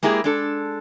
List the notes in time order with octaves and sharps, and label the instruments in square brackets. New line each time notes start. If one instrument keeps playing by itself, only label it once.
[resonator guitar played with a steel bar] G#3 A#3 E4 G4 G#4
G#3 D4 A4